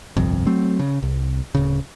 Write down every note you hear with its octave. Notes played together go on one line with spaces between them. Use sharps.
G1 C2 F2
F#3 A3 C4
C#3
C2
D1 C#3